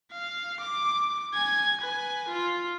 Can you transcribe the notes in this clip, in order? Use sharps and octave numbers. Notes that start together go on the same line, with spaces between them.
F5
D6
G#5 G#6
B4 G#5
F4